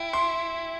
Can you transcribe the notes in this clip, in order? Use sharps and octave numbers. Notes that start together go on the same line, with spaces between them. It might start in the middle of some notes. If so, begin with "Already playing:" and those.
Already playing: E4 G5
C6